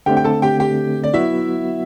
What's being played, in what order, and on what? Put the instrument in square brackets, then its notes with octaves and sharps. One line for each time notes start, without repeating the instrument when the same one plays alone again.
[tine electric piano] D3 A3 C4 [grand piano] G4 G5
[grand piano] G5
A4 A5
G4 G5
G4 G5
D5
[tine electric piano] F#3 B3 F#4 [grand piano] E4 E5